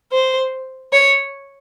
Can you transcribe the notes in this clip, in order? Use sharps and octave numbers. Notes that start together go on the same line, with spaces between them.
C5
C#5